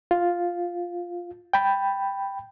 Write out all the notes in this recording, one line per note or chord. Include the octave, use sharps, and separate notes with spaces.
F4
G5 B5